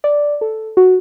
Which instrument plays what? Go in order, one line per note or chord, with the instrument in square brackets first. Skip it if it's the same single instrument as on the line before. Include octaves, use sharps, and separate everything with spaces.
[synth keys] D5
A4
F#4